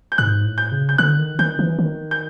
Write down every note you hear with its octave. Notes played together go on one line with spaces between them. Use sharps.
G6
G#2 F#6
A2
G6
C#3
G6
D3 F#6
D#3
D#3 G6
E3
D#3
G6